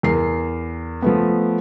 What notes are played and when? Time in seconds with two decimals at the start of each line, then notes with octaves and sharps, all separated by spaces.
0.03 E2 A#4 C7
1.02 F3 A3 B3